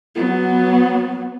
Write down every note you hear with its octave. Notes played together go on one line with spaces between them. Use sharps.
F#3 B3